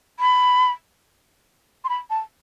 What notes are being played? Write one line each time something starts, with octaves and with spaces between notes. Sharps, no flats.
B5
C6
B5
A5